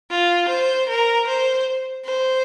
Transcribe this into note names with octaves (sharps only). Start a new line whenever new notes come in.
F4
C5
A#4
C5
C5